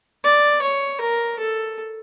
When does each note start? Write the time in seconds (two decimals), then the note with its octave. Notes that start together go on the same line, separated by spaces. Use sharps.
0.24 D5
0.62 C#5
1.01 A#4
1.39 A4